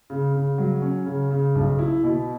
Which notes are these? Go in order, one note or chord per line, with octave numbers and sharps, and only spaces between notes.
C#3
C#3
F#3
C#4
C#3
C#3
B1
E4
B2